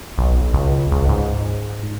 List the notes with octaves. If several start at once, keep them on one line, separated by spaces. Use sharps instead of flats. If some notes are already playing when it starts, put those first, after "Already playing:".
B1
C#2
C#2
G#2